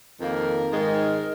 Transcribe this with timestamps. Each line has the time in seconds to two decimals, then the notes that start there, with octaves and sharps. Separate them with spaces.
0.20 F2 D#3 A#3 A#4
0.71 G#2 D#3 G#3